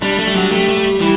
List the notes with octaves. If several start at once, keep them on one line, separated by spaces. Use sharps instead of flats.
G3 D4
A3
G3
F#3
A3 G4
A3
G3
E3 G3